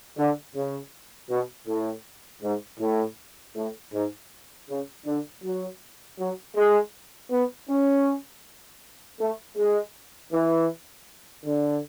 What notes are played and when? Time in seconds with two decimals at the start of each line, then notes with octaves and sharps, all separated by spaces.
0.17 D3
0.54 C#3
1.29 B2
1.67 A2
2.42 G#2
2.80 A2
3.56 A2
3.93 G#2
4.69 C#3
5.06 D3
5.43 F#3
6.19 F#3
6.55 G#3
7.31 B3
7.69 C#4
9.20 A3
9.56 G#3
10.32 E3
11.45 D3